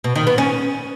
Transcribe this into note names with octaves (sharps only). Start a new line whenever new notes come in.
B2
D#3
B3
C#4